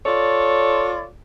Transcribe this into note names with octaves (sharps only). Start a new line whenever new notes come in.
F4 A4 C#5 D5